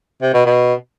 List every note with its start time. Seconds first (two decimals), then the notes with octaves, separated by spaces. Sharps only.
0.22 C3
0.34 B2
0.46 B2